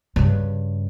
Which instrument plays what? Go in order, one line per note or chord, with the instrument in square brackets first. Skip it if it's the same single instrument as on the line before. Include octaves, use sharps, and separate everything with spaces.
[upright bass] G2 C#3